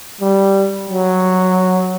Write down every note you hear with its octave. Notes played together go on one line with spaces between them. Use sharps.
G3
F#3